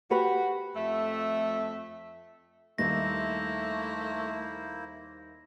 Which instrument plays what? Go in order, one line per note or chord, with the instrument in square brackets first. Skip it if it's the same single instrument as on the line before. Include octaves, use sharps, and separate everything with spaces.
[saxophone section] F#4 [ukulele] G4 B4
[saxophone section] F2 A3 E5
[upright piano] D#2 G3 D#5 [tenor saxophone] A3 [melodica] A#3 E4 C5 [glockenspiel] A#6